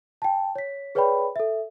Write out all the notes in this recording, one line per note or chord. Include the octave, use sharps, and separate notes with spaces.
G5 A5
C#5 B6
G#4 B4 C#5 D5 G5 B5
A4 E5